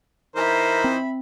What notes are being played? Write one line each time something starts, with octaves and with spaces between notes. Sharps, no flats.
E3 D#4 A#4 C5 E5 B5
C4